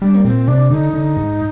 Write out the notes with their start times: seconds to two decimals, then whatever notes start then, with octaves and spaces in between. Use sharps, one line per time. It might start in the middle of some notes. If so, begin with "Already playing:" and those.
0.01 G3 D4
0.15 A#3
0.25 A#2 C4
0.48 C3 D4
0.71 D3 D#4
0.94 D3
1.17 G#2